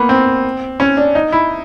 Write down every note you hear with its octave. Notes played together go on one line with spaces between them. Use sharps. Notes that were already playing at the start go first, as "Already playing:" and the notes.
Already playing: A#3 B3
C4
C#4
D4
D#4
E4